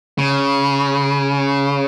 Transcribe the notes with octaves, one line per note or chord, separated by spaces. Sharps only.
C#3